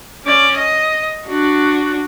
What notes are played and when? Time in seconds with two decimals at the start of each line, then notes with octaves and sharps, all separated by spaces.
0.24 C#4 D5
0.57 D#5
1.27 D4 F#4